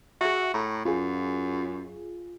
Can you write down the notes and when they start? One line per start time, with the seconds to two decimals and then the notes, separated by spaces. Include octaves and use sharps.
0.21 F#4 G#4 E5
0.54 A2 A5 A#5 C#6
0.85 F#2 F4 G#4